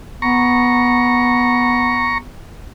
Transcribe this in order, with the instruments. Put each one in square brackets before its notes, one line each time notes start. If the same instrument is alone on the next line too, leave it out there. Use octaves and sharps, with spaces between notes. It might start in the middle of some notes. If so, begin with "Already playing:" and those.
[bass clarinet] B3 [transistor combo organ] A#5 C#6